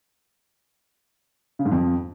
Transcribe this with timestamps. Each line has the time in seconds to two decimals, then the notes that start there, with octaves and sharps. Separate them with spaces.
1.59 C#3
1.65 G#2
1.72 F2